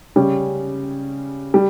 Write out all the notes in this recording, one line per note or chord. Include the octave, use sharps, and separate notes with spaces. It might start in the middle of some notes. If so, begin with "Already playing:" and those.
C#3 G3 C#4
G3